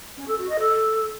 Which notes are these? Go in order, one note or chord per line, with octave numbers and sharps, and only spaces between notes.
C#4
A4
F#4
D#5
A4